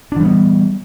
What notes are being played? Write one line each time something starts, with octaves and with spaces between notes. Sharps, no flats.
E3 G3 B3 D4